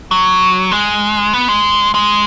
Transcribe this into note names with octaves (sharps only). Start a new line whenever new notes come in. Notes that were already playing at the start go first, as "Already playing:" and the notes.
F#3
G#3
B3
G#3
G#3